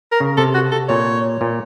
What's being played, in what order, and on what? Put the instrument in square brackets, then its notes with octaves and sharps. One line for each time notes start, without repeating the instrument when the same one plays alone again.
[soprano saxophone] A#4
[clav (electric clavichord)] C#3
[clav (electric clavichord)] C3 [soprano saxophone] A4
[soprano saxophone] F#4
A4
[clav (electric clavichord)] A#2 [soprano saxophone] C#5
[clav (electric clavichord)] A#2